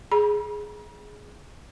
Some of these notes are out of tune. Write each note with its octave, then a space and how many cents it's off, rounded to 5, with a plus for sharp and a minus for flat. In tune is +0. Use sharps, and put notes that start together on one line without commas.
G#4 +5 B5 -30